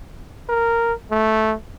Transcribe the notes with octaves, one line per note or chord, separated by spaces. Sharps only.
A#4
A3